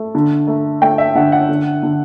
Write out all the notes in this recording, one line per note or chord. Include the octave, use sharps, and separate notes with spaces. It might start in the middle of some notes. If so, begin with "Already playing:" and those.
Already playing: A3
D3
A3
A3 G5
E5
D3 F#5
F#5
D3
D3